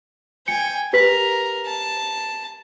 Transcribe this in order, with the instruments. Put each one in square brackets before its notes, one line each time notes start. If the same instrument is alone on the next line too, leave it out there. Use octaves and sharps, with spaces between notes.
[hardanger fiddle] G5 G#5 [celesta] C#7
[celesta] G4 B4 B6 [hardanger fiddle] A#4
[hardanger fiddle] A5